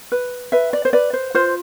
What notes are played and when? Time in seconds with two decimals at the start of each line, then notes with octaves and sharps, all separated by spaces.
0.12 B4
0.52 B4 E5
0.73 D5
0.85 C5
0.93 B4 D5
1.13 C5
1.34 F4 C5